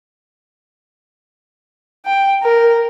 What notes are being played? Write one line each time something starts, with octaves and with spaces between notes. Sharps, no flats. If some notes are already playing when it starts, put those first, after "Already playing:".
G5
A#4